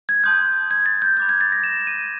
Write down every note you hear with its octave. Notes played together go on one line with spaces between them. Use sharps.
G#6
A5 C6 D#6 F#6 G6
G#6
A6
G6
B5 D6 F#6 G#6
G#6
A6
A#6
E7
D#7